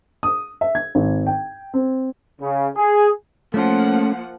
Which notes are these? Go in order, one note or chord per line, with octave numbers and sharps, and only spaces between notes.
D#6
E5
G#6
G#1
G5
C4
C#3
G#4
F3 A3 A#3 C#4 F#5